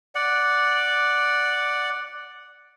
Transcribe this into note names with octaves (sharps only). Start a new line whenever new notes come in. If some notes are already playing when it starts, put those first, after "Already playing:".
D5 F#5